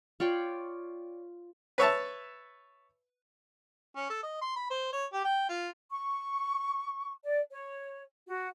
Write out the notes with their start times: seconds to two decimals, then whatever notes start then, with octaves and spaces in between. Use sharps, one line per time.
0.20 F4 C#5 D5 G5
1.78 B4 C#5 E5 A5
3.96 C#4
4.10 A4
4.23 D#5
4.41 C6
4.56 B5
4.70 C5
4.93 C#5
5.13 G4
5.25 G5
5.49 F4
5.89 C#6
7.23 D5
7.50 C#5
8.27 F#4